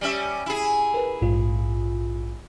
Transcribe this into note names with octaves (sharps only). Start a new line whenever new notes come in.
G3 C#4 E5
E4 G#4
A#4 B4
A#1 G#2 F4